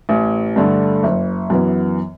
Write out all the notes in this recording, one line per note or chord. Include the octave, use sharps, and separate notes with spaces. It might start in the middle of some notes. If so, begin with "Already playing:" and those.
A1
G2 D3 A3
F#1
F#2 E3 B3